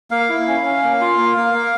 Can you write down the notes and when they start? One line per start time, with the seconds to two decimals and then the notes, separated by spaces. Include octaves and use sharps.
0.11 A#3 F5
0.29 E4
0.48 C#4
0.65 C#4
0.83 A#3
1.01 F4
1.18 A#3
1.37 A#3
1.54 A#3